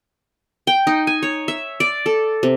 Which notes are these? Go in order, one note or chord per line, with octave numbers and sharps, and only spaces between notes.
G5
D#4
G#5
C#5
E5
D5
A4
C3